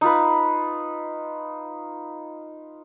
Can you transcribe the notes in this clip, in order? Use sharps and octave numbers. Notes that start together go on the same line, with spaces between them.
D#4 F4 B4